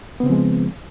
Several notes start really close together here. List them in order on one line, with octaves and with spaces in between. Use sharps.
B3 C#3 C4 F3 G#3